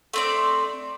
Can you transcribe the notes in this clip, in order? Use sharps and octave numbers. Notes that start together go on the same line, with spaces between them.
A3 C4 D5